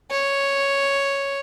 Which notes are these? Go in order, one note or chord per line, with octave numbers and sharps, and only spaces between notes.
C#5